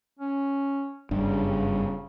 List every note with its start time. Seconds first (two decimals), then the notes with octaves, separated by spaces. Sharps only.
0.20 C#4
1.11 F#1 G2 C#3 D4